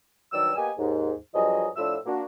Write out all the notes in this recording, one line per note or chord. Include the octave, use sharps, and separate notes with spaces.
G2 D#3 F#3 G3 D5 E6
A#3 B3 G4 D#5 G#5
D#2 G#2
G2 F3 F#3 G#4 D#5
A2 F3 D4 F4 E6
A#3 D4 F#4